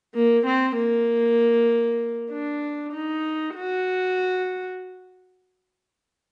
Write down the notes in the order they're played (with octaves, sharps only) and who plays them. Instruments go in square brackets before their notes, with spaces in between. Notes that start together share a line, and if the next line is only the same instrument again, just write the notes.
[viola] A#3
C4
A#3
D4
D#4
F#4